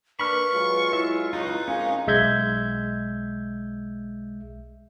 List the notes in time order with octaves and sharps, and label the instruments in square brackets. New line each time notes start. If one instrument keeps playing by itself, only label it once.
[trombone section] A#3 D4 [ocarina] B4 [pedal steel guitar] B5 F6 [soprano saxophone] C#6
[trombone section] F#3 G#3 F4
[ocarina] E4 [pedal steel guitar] E5
[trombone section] C#2 [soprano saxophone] D#4 [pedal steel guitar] F4 B4
[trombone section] F2 A#2 G#3 [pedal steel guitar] C#4 [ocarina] F5
[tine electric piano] B1 G#3 E5 G6 G#6